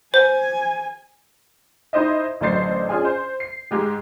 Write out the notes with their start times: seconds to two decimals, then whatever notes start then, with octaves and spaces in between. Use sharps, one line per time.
0.14 C5 G#5
1.93 D#4 E4 C5 D#5 E5
2.41 A1 D3 F#3 C5 A6 C7
2.89 C#4 D4 F4 G#4 G#5
3.05 C5
3.40 C7
3.71 G#2 G#3 G4